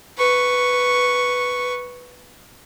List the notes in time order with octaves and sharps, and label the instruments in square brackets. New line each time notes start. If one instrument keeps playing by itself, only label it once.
[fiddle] B4 C#6